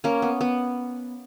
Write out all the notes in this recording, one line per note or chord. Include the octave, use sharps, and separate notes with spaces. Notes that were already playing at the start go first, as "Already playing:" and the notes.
A#3 C#4
B3
B3